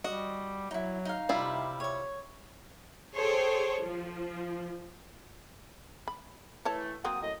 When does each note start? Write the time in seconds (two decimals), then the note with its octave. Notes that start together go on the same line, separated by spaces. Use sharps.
0.04 G3 F#4 D#5
0.71 F#3 D#4 E4
1.05 D#4 F5
1.29 C3 G3 E4 F4
1.80 C#5 C#6
3.16 G#4 A4 C5 C#5 G5 C6
3.82 F3
6.08 B5
6.65 E3 A3 A4 C#5 A5
7.04 F#3 A#3 C4 F#5 D#6
7.22 F#2 A2 D#5